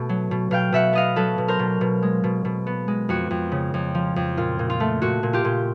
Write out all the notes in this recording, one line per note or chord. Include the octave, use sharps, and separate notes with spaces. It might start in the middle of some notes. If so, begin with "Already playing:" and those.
Already playing: B2 A3
F#3
B2
B2 F5 G5
B2 E5 F#5
B3 D#5 F5
F#3 A4 B4
B2
A#4 C5
B2
B2
G#3
B2
B2
B3
G#3
F2 F#4
F2
C#3
F2
F3
F2
A#2 F4
A#2
F4
A3
A#2 F#4
A#2
F4 G4
A#2